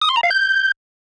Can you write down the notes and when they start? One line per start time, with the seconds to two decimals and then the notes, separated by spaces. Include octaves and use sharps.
0.02 D#6
0.09 C6
0.16 A#5
0.23 F5
0.31 G6